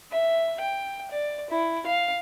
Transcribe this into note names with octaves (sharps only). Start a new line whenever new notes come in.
E5
G5
D5
E4
F5